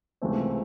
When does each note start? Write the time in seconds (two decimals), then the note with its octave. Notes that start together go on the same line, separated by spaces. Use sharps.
0.22 C#2 C3 E3 A3 C4